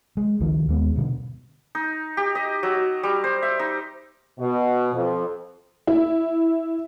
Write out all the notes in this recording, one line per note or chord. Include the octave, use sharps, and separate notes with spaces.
G#3
C#2 D#3 F3
D#2 G#3 B3
G2 B2 D3
D#4
G4
D#5
F#3
G3
C5
E5
D#4
B2
F2
E4